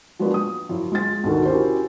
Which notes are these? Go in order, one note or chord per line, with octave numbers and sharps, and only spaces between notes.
F3 F#3 G#3 A#3 B3 D4
D#6
F#2 F3 E4
G#3 F4 A6
D2 B2 D#3 A4
C#4 E4 F#4 G4 A#4 C5